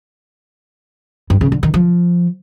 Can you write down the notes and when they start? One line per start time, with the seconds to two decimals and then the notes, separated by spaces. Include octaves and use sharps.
1.30 G2
1.41 C#3
1.52 D3
1.63 D#3
1.74 F3